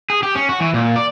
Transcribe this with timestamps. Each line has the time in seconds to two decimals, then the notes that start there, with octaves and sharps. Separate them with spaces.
0.10 G#4
0.23 G4
0.35 C#4
0.49 F#4
0.60 E3
0.74 A#2
0.96 D5